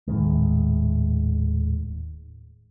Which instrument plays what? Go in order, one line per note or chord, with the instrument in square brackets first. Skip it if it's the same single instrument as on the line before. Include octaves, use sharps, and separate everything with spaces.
[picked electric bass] D#1 A2 D#3 G#3